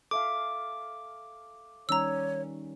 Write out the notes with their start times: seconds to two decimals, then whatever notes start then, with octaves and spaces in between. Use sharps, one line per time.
0.11 A4 E5 F5 D6
1.89 D#3 G3 C#4 C#5 A#5 E6